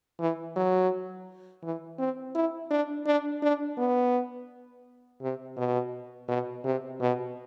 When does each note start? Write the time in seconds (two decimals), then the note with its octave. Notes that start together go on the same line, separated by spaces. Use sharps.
0.20 E3
0.56 F#3
1.63 E3
1.99 C4
2.35 E4
2.71 D4
3.06 D4
3.43 D4
3.78 B3
5.22 C3
5.57 B2
6.28 B2
6.65 C3
7.01 B2